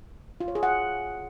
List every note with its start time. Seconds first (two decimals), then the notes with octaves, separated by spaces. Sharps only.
0.40 F4
0.48 C#5
0.55 G#4
0.63 F#5